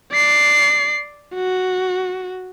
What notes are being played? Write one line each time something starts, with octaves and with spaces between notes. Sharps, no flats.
D5 C7
F#4